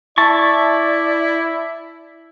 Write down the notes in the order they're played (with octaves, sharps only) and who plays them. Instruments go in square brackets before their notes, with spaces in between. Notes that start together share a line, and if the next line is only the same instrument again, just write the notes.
[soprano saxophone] E4 [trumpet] D5 [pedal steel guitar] A5 C#6